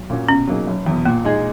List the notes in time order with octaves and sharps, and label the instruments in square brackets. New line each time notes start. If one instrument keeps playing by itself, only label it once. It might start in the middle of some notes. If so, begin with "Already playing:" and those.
Already playing: [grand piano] B1
A#2 A#3 C#4 F#4
[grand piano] B2 [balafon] C#4
[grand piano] F#3 A#3 D#4 G#4
F#1
E2 B2
[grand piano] A#2 [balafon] A#3
[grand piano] G#3 D#4 G#4